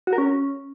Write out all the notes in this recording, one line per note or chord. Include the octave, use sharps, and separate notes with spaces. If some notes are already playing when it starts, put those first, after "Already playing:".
F#4
A#4
C#4